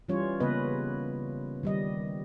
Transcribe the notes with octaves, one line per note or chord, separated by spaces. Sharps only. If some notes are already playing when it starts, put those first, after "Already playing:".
E3 G3 C#4 F4 C#5
C#3 A#3 B3 B4 D#5
D#3 G3 D#5